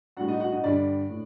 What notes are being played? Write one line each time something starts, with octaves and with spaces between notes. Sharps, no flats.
A2 G3 D4 F#4 F#5
D#4 D#5
F#4 F#5
D#4 D#5
G2 D3 G3 D4 D5
A2